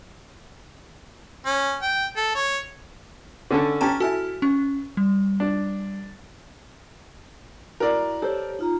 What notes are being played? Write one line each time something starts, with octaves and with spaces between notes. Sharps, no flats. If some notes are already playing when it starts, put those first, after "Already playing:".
C#4
G5
A4
C#5
D3 C#4 A4
C#4 G4 A5 A#5 F6
E4 F#4 A4 G#5 F6
C#4 C#6
G3
D4
E4 F#4 A#4 D5
G4 A4 C5 C#5
D#4 F4 A#5